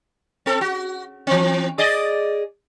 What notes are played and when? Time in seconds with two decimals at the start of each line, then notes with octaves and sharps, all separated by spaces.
0.46 C4 A4
0.61 F#4
1.27 E3 C4
1.78 G#4 D5 D#5